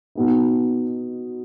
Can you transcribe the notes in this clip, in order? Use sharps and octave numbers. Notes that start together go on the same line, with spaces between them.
B2 B3 D#4